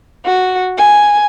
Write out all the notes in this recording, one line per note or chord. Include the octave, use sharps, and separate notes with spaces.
F#4
G#5